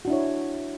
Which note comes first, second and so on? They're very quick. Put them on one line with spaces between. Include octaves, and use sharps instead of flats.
F#4 D4 E4 C#5